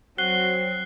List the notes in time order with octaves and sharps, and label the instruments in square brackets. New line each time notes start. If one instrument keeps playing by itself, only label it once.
[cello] F#3 [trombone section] C4 F#4 [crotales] F#6 C7 G7